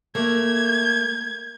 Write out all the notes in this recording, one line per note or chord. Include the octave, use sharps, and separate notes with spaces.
A3 A#3 G#6